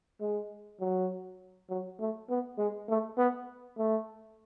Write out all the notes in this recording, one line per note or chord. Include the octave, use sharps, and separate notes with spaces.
G#3
F#3
F#3
A3
B3
G#3
A3
B3
A3